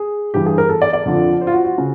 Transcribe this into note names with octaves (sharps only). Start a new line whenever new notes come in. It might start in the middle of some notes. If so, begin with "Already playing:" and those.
Already playing: G#4
G2 E3 G4
G#4
A#4
A4
D5
D5
F2 D3 F3
C5
F4
F#4
F#4
C#3